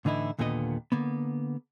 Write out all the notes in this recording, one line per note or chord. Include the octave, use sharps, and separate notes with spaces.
A2 D3 E3 D#4 E4
D#2 A#2 D3 B3 G#4 D#5
D3 A#3 B3